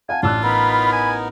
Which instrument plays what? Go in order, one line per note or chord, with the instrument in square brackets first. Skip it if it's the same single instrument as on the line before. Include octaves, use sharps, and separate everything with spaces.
[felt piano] F5 F#5 A5 [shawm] G#5
[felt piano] A1 E6 F#6 [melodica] D4 [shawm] F4
[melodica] B3 D#4 A#4 [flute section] B5
[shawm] G#5